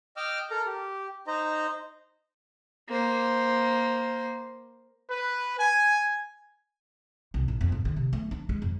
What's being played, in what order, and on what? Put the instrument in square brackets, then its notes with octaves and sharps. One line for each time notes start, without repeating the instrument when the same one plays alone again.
[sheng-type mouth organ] D#5 G5 D6 E6 F6
A4 A#4 A#5
G4
D#4 C5 D#5 A#5
[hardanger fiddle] A#3 C5
[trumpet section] B4
G#5
[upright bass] C2
A#1
F2
A2
D3
C3
A3
D4
G#3
F2